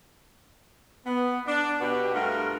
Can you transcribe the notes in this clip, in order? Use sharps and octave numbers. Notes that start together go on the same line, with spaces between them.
B3
D4
B2 B3 F#4 G4
G2 A3 F4 F#4 A#4